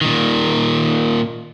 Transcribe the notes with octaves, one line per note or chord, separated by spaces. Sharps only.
A#2 D#3